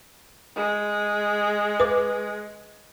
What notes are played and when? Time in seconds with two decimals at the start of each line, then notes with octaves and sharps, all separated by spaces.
0.56 G#3
1.80 B4 D6